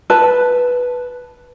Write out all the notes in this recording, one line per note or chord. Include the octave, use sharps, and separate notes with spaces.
B4 A5